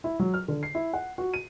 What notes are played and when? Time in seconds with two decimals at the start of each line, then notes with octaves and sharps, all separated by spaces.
0.04 E4
0.19 F#3
0.34 F6
0.48 D3
0.63 C7
0.75 E4
0.93 F#5
1.18 F#4
1.34 D#7